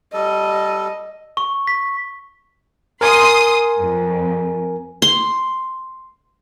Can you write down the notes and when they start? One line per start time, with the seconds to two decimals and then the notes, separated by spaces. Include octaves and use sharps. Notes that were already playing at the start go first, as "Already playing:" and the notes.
0.13 G3 A4 D#5
1.37 C#6
1.67 B6
3.01 A#4 G#5 C6 D#6
3.79 F2
5.02 C6